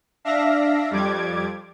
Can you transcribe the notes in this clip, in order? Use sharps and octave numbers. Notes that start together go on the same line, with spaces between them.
D4 E5 F5 A#6
F2 G3 D6 G#6